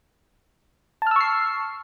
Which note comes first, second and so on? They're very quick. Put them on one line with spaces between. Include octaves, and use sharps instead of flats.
A5 F6 E6 C#6 C7